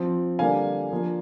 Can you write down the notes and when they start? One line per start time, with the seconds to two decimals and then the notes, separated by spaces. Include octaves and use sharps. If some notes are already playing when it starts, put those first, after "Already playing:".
Already playing: F3 C4
0.39 D3 G3 A#3 D4 F5 G#5
0.92 F3 A#3 D4